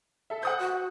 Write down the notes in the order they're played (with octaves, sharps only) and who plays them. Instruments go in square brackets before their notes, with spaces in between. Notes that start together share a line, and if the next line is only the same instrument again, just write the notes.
[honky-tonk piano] A4 E5
[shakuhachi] C5 [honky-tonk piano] F#5 D#6 G6
[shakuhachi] F#4